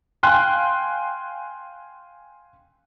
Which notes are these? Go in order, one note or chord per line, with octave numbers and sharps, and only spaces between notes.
F5 G5 G#5 C6 F#6